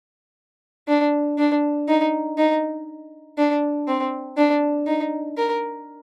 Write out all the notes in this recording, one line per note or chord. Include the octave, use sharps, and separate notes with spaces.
D4
D4
D#4
D#4
D4
C4
D4
D#4
A#4